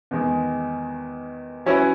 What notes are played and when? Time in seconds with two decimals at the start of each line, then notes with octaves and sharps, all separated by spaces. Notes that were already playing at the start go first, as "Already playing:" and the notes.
0.11 E2 D#3 G#3
1.66 F#3 C#4 E4 B4